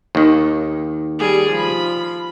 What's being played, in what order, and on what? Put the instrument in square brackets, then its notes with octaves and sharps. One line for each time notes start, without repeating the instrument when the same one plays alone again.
[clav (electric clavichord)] D#2 D#3
[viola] G3 G#4
F3 B5